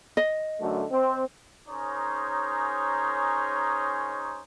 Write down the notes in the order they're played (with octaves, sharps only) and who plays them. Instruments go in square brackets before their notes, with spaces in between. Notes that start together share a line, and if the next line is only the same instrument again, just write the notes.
[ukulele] D#5
[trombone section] F#2 D3 A3
C4
[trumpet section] C#4 D#4 G#4 A#4 C5 C#5